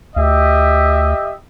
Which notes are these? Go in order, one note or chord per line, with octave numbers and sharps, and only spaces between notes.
D2 G4 D#5 E5